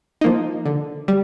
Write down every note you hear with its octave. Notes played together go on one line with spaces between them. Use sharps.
F3 A#3 D#4
D3
G3